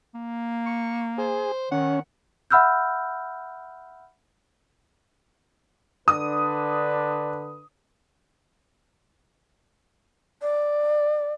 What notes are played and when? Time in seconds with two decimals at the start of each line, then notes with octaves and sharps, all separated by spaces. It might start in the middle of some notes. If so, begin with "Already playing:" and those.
0.14 A#3
0.66 C#6
1.18 G#4 C5
1.72 D#3 C#4 F#5
2.50 E5 F#5 B5 E6 F6 G6
6.08 D3 D4 B4 D#6
10.42 D5